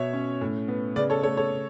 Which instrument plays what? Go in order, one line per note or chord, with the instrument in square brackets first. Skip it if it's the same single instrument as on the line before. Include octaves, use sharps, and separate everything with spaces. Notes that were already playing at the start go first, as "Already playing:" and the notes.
Already playing: [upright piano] B2 C#5 E5
C#4
A2
B3
C#3 B4 D5
A4 C#5
A3 A4 C#5
A4 C#5